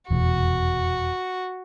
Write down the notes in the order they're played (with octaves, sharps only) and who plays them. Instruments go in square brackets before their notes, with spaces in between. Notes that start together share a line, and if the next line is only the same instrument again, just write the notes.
[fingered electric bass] F1 E2 B2 [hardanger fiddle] F#4